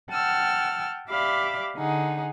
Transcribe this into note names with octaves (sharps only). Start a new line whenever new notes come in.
F#5 G5 A5 E6 F6
G4 D5 E5 F5 B5 D6
D3 D#4 G#4 F#5